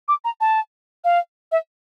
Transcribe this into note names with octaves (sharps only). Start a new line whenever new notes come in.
D6
A#5
A5
F5
E5